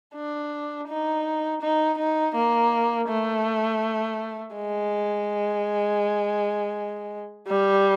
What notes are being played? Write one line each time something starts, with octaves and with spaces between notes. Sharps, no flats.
D4
D#4
D#4
D#4
A#3
A3
G#3
G3